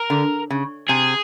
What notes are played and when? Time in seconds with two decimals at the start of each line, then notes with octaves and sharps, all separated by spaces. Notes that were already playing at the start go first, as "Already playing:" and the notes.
Already playing: A#4
0.10 D3
0.50 C#3
0.89 C3 G#4